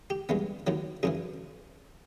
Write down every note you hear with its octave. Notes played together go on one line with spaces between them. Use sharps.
G4
G2 E3 G#3 B3
D#2 D#3 F#3
F#2 C#3 E3 G#4